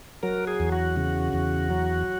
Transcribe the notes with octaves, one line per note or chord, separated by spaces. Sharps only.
F#3 A#4
G#4
E2
F#4
C#3
E2
F#3